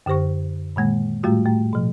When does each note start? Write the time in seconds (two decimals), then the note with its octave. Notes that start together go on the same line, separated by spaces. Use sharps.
0.06 F#2 D3 G4 C5 C#6
0.76 A#2 D#3 G#3 A#3
1.23 A2 G3 A3 F4 F#4
1.46 A2 A3
1.73 B2 F3